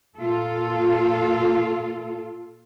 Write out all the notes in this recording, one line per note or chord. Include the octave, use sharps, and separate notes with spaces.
A#2 F4 A4